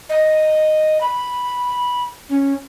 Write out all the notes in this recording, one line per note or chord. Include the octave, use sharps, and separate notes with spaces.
D#5
B5
C#4